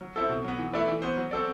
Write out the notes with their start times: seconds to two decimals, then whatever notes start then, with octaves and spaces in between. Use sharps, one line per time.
0.01 F#3
0.16 C4 E4 A4
0.29 B2
0.44 F#3 B3
0.59 E3
0.73 A3 E4 B4 D5
0.88 E3
1.02 B3 F#4 C5
1.17 F#3
1.31 C4 F#4 A4 D5